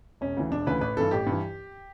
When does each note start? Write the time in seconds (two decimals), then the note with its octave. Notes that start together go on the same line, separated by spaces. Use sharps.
0.21 E1 C#4
0.37 D2 C#3 E3
0.51 E1 D4
0.66 D2 C#3 E3 B4
0.81 A1 B4
0.97 G2 E3 A4
1.11 A1 G4
1.27 G2
1.32 E3